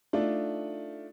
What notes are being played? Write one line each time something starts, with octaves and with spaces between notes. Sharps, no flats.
A3 D4 D#4 F4